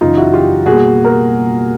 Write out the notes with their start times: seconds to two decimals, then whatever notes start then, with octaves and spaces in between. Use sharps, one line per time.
0.01 F#2 C#3 E3 D#4 F4
0.17 E4 F#4
0.33 F4 G4
0.66 B2 G3 A#3 F#4 G#4
1.04 A#4